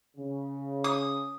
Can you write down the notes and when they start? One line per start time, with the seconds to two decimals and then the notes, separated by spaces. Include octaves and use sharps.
0.17 C#3
0.84 D#6